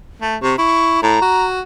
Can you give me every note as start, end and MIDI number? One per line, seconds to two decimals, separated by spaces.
0.22 0.36 57
0.42 0.55 48
0.42 0.54 85
0.58 1.02 64
0.58 1.03 85
1.03 1.20 45
1.03 1.45 82
1.22 1.61 66